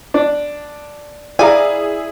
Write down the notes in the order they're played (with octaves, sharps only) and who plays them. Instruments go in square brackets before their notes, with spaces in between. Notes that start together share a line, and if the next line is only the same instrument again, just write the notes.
[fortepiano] D4
[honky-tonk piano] E4 G#4 [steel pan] D5 A#5 [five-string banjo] F5 G#5